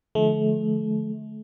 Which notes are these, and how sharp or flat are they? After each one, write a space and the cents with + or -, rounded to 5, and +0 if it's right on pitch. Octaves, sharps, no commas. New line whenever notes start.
D3 +20 F3 +0 A3 -35